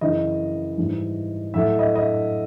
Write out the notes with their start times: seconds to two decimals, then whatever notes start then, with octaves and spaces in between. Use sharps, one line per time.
0.01 F#2 C#3 E3 D#5
0.78 G#2 E3 G3
1.54 A2 F#3 A3 E5
1.79 D#5
1.96 D#5